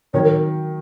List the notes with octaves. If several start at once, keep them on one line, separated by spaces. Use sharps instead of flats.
D#3 F#3 C#5
A#4